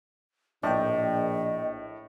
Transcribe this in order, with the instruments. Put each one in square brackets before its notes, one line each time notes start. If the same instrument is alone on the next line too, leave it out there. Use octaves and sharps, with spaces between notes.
[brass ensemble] A#1 [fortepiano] A2 [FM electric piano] D5 G5 [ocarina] D#5